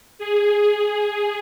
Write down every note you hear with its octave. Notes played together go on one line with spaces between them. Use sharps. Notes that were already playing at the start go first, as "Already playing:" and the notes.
G#4